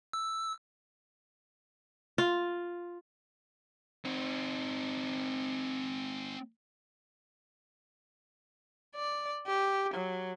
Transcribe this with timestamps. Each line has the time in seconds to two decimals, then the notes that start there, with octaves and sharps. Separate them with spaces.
0.13 E6
2.18 F4
4.05 C4 D#4
8.96 D5
9.47 G4
9.94 F#3